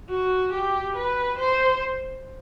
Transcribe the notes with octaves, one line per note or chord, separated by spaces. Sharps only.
F#4
G4
B4
C5